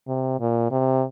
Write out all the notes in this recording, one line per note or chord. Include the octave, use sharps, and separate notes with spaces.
C3
A#2
C3